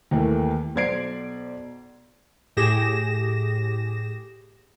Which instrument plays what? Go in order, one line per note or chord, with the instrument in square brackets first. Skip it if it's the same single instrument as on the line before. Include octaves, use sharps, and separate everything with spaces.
[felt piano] D#2 E3 A3 A#3
B1 C5 D5 G#6 C7 D7
[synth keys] A2 G4 G#4 A#6 E7